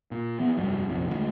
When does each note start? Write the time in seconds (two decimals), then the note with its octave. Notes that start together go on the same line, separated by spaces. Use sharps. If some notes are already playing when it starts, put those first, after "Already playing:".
0.11 A#2
0.39 E3 B3
0.57 F1 C2 G2 F#3
0.89 F1 A#1 F2
1.09 D2 D#3 G#3